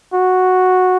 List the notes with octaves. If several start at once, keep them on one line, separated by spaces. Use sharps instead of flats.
F#4